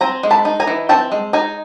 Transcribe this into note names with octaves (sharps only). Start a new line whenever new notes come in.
C4 G#5 A#5
G#3
A5 B5
D#4
G#5 A#5
E3
C4 G5 A5
G#3
D#4 G#5 A#5